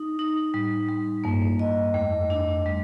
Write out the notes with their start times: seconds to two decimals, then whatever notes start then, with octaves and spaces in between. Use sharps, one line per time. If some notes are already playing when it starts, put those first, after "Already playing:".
Already playing: D#4
0.19 D#4
0.54 A2 G3
0.89 G3
1.24 G2 A#3
1.59 D#5
1.94 F2 A3
2.30 D4
2.66 G3